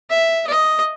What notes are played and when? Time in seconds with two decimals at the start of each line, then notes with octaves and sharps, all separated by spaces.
0.10 E5
0.47 D#5